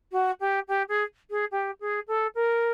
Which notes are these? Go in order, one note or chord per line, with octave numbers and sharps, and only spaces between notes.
F#4
G4
G4
G#4
G#4
G4
G#4
A4
A#4